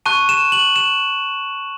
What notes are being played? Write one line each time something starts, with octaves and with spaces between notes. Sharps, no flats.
A5 C#6 F#6 D#7
E7
F#7
E7